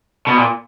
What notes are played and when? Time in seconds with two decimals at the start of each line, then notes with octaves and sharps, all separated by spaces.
0.27 B2
0.38 A#2